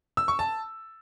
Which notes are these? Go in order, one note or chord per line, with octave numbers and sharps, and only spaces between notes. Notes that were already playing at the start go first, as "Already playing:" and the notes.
E6
C#6
A5